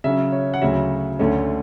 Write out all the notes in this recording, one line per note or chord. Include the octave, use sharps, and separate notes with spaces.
C#3 F#3 C#4 E5
C#5
F#5
D2 C#3 F#3 E5
D2 D3 A3 C#4